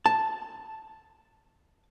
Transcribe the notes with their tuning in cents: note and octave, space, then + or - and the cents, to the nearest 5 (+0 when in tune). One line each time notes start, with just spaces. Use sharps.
A5 +0